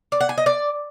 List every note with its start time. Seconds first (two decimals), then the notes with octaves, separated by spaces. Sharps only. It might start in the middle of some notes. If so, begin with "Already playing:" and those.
0.12 D5
0.21 F#5
0.29 G#5
0.38 D#5
0.46 D5